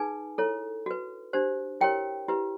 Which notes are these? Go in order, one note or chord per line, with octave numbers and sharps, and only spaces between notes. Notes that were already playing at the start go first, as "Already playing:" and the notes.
Already playing: D#4 G#4 B4 G#5
E4 A4 C#5
F#4 B4
D4 G4 C5
E4 G4 A#4 C#5 G5
E4 G4 B4